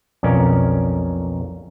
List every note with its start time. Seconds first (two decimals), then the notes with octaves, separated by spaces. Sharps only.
0.23 B1 F2 C#4 A#4 D5 A5